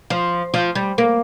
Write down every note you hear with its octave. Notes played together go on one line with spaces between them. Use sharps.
F3
F3
G3
A#3